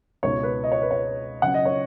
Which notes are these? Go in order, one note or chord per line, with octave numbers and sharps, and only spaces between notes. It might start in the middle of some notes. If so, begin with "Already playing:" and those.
C#2 B2 B3 D#4 C#5
B4
D#5
C#5
B4
C#5
C#3 F#3 C#4 F#5
D#5
C#5